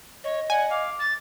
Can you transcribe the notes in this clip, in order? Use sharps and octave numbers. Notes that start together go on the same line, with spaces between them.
C#5 D#5
D5 F#5 G#5
F5 D6
A6